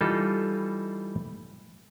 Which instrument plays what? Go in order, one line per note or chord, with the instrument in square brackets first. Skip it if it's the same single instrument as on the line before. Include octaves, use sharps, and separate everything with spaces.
[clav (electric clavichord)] E3 G3 D#4 F4 A4